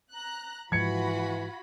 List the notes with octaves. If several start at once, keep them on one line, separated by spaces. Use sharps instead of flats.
A#5 F#6
G#2 E3 F3 F4 F#4 B5 G#6 C#7